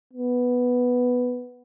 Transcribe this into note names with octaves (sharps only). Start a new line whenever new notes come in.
B3